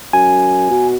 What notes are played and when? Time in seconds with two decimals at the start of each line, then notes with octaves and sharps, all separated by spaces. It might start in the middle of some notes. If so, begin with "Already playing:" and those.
0.13 F#2 G#5
0.70 B2